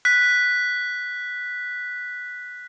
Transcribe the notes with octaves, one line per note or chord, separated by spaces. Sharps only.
F#6 B6